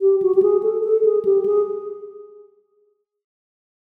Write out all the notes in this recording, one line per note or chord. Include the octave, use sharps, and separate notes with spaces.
G4
F#4
G4
G#4
A4
A4
G#4
G4
G#4